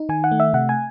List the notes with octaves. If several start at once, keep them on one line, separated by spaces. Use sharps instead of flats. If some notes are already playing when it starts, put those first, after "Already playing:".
Already playing: D#4
D#3 G#5
F#5
A3
E5
C3 F#5
G#5